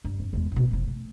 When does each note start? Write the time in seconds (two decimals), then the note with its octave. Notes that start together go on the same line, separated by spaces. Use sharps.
0.04 G2
0.20 F2
0.33 E2 G#3
0.52 A1 B2
0.71 F1 F3
0.87 A3